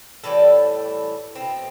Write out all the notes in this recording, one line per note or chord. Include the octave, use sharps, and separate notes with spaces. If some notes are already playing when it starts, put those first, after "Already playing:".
A2 E3 G3 A4
B2 A3 C4